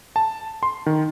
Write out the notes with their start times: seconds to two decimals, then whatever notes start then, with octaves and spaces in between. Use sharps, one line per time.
0.16 A5
0.63 C6
0.86 D#3